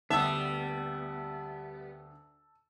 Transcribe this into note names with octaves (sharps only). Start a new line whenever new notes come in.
D2 G3 B3 E5 A5 E6